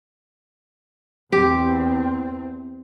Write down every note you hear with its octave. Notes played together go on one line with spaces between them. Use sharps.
E2 C4 G4